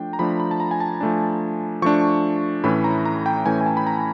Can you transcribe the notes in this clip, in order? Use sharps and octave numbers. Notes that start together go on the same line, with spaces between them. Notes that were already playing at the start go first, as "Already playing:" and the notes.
Already playing: F3 A3 D4 G5
A#5
F3 A3 D4 B5
B5
A5
A#5
G#5
A5
F3 A3 D4
F3 A3 D4 C#6
A2 E3 A3 C#4 B5
A#5
A#5
G5
A2 E3 A3 C#4 G#5
G#5
A5
B5
A#5